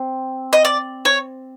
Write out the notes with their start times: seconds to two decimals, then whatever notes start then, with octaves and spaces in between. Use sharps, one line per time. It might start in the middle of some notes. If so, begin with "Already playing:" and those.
Already playing: C4
0.53 D#5
0.65 D5
1.05 C#5